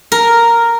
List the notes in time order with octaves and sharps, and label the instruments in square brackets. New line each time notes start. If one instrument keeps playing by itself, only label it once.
[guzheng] A#4